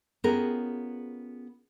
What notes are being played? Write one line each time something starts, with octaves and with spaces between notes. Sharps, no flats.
B3 C#4 F4 G4 G#4 A#4